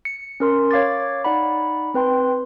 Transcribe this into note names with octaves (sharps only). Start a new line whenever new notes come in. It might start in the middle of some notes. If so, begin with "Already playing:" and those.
C#7
C#4 A#4 C6
C#5 F5 D6 A6
D#4 D5 F#5 B5
C4 B4 G5 C6